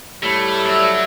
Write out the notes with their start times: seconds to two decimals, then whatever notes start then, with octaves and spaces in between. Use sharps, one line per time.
0.23 A2 G3 A3
0.66 F#3 D5 E5